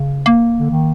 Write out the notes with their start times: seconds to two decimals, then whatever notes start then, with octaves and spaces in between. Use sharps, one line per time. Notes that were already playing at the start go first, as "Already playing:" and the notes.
Already playing: C#3
0.26 A#3
0.59 D3
0.70 D#3